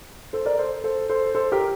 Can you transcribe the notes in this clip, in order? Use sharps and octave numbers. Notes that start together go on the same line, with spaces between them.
A4 C5
A#4 D5
A4 C5
A4 C5
A4 C5
A4 C5
G4 A#4